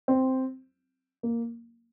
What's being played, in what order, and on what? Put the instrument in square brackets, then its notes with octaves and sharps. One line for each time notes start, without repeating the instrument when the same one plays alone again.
[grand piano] C4
A#3